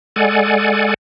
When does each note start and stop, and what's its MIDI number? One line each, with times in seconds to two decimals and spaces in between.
0.16 0.94 56
0.16 0.94 69
0.16 0.94 74
0.16 0.94 78
0.16 0.94 80